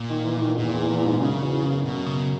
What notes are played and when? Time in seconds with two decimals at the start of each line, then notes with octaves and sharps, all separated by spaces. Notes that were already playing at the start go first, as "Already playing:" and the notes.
Already playing: A#2
0.10 D#3
0.25 E3
0.37 E3
0.42 D#3
0.57 E2 A#2
0.73 E2
0.89 E2
1.06 G#2
1.21 F#2 C#3
1.43 E2
1.64 F#2
1.85 B2
2.06 C#3